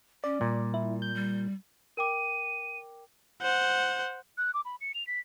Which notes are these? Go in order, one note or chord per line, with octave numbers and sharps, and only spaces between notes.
C#4 D5
A#2 G3
E4
G6
G3
A#4 G5 D6 D#7
C5 F#5
F#6
D6
B5
C#7
F7
B6